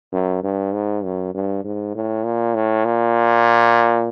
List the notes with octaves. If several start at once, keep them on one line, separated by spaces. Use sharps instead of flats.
F#2
G2
G#2
F#2
G2
G#2
A2
A#2
A2
A#2